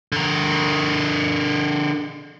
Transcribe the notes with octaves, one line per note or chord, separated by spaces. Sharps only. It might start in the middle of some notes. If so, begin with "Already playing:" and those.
D3 A#4